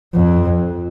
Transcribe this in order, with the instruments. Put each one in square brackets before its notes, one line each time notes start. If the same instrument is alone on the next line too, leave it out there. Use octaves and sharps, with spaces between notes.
[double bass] F2